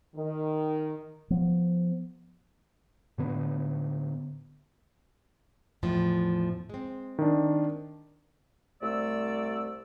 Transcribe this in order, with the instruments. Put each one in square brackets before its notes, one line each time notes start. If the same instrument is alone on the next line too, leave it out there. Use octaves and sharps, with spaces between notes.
[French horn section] D#3
[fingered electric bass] F3 B3
[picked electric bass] A2 D3 B3
[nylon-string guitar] E2 A2 F3
G#3 C4
[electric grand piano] D#3 D4
[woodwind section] C2 C3 A3 D5 E6